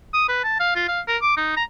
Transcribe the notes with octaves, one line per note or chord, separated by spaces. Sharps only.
D#6
B4
A5
F5
F4
F5
A#4
D6
D#4
A#5